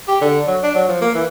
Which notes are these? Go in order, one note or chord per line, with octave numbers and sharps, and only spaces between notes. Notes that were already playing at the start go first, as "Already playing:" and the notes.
G4
D3
F#3
D4
F#3
F3
A#3
E3